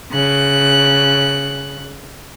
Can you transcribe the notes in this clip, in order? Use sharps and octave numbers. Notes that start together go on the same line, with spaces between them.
C#3 F#6